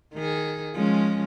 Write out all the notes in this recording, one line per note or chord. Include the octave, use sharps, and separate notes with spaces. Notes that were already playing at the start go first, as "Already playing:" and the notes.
D#3 G#4
F3 G#3 C#4